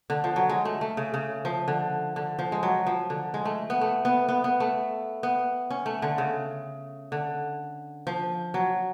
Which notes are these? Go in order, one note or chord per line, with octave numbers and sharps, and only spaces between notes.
D3
F3
F#3
G#3
A3
A3
C#3
C#3
F3
D3
D3
F3
G#3
F#3
F3
D3
G#3
A3
B3
A3
B3
B3
B3
A3
B3
C#4
A3
D3
C#3
D3
F3
F#3